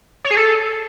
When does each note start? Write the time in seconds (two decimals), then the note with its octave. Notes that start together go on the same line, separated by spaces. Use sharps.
0.25 C#5
0.31 G#4
0.37 A4